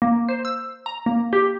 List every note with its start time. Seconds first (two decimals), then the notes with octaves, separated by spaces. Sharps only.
0.02 A#3
0.29 C5
0.45 E6
0.86 A#5
1.06 A#3
1.33 G4